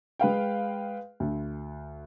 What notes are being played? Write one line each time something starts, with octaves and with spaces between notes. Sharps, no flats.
G#3 B4 F5 G5
D2